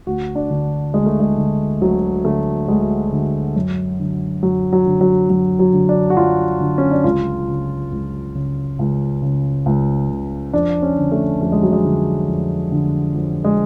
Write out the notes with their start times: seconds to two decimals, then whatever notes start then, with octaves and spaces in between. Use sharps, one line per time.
0.07 D2 F#4
0.35 D4
0.50 D3
0.94 D2 G#3
1.06 A3
1.20 G#3
1.37 D3
1.81 D2 F#3
2.25 D3 A3
2.68 D2 G#3
3.12 D3
3.56 F#2
4.00 D3
4.43 F#2 F#3
4.73 F#3
4.86 D3
5.01 F#3
5.30 F#2 F#3
5.59 F#3
5.73 D3
5.89 D4
6.10 F#4
6.17 F#2 F4
6.60 D3
6.78 C#4
6.91 D4
7.04 C#2 F4
7.48 C#3
7.92 C#2
8.35 C#3
8.79 C#2
9.22 C#3
9.66 C#2
10.10 C#3
10.53 F2 D4
10.82 C#4
10.98 D3
11.12 A3
11.41 F2 A3
11.52 G#3
11.63 F#3
11.73 G#3
11.84 D3
12.28 F2
12.72 D3
13.15 F2
13.44 G#3